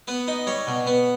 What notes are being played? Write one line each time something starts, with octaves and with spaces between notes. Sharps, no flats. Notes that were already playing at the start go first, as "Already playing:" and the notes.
B3 B4
D#4
G3 C#5
B2
B3